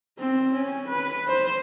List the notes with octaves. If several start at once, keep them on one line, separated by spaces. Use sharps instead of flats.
C4
C#4
B4
C5